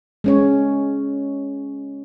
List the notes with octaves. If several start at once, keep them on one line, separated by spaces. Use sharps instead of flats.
G#3 C#4 C#5